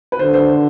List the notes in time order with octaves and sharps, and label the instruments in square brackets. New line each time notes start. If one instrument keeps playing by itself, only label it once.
[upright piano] B4
[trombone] D3 [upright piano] C5
[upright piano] C5